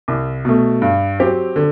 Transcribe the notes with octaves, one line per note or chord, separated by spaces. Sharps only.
C2
B2 A3
G2
F#3 C4 G4
D3